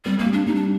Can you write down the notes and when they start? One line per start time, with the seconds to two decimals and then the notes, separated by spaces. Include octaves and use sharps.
0.05 G3 C4
0.19 A#3
0.26 G3
0.33 D4
0.46 G3 D#4
0.55 D4